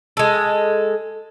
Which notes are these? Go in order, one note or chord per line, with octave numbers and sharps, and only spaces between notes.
G#3 A4